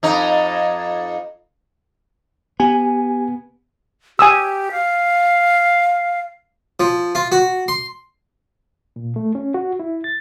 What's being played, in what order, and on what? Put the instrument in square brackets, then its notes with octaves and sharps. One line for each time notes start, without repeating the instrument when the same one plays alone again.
[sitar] F2 D#4
[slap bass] B3 [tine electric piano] G4 G#5
[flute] G4 [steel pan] G#5 D#6 E6
[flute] F5
[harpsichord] F3
F4
F#4
C6
[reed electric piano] A#2
A3
C#4
F#4
E4
A6